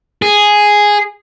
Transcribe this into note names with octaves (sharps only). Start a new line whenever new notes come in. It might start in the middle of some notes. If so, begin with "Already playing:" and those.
G#4